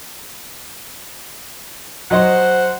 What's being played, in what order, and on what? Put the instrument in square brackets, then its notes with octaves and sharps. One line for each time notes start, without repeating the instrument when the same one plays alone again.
[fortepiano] F#3 D#5 [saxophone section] C5 F#5